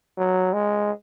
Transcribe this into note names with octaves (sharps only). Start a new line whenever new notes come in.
F#3
G#3